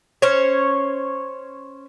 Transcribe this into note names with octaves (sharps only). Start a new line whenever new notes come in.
C#4 C5 C#5